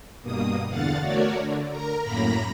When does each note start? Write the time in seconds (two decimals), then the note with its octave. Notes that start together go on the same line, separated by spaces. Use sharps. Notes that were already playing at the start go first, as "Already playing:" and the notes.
0.23 G2 B2 A#3 D#6
0.66 E2 D3 F5 F#5 A6
1.01 A3 F#4 A#4 C#5 D5
1.39 D3
1.70 A#4 A#5
2.02 F#2 A2 A#3 A#5 B5 A#6